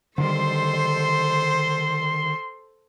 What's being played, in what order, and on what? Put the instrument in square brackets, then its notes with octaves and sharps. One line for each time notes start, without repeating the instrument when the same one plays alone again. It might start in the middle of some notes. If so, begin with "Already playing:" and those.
[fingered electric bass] D3 D#3 G3 [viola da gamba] A4 C5 [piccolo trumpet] C6